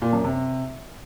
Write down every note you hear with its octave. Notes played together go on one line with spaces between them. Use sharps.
A#2
F#2
C3